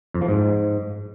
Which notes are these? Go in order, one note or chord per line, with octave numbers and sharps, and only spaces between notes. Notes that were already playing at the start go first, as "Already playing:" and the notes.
F2
F3
G#2